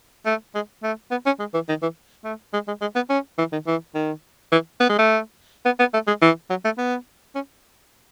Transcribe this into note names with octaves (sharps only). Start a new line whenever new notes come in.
A3
G#3
A3
B3
C#4
G#3
E3
D#3
E3
A3
G#3
G#3
G#3
B3
C#4
E3
D#3
E3
D#3
E3
B3
G#3
A3
B3
B3
A3
G#3
E3
F#3
A3
B3
C#4